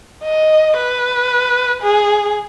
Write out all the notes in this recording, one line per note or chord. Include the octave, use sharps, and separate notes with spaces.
D#5
B4
G#4